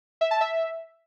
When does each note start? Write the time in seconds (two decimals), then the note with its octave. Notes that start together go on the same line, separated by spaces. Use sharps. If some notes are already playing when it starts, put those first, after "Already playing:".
0.21 E5
0.31 A5
0.41 E5